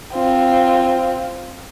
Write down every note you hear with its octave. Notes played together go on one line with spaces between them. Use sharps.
C4 F4